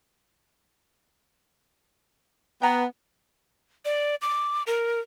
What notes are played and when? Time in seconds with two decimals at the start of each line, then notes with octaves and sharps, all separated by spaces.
2.62 B3 G5 A#5
3.85 D5
4.22 D6
4.67 A#4